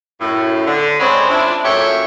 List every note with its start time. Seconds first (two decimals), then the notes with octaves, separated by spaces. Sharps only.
0.21 F#2 A2
0.67 D3
1.00 C#3 G#3 C4 C#5 D5 B5
1.29 D4 E4 F4
1.65 F#2 A#2 A3 G4 C#5 E5